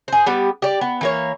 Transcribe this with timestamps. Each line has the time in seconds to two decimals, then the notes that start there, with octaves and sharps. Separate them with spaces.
0.08 G#4 C5
0.26 G3 B3 G4
0.62 G4 D5
0.81 B3
1.01 E3 A#3 C#5